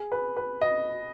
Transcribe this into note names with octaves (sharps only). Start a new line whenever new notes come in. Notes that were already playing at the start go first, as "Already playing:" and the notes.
Already playing: G#4
B4
B4
D#5